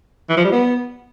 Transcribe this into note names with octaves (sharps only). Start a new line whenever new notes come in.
E3
F3
G3
B3